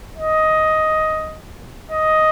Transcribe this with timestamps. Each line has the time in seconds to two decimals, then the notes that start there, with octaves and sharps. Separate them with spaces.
0.17 D#5
1.91 D#5